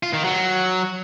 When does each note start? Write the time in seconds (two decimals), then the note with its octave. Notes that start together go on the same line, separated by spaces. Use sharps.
0.03 F4
0.13 D#3
0.24 F#3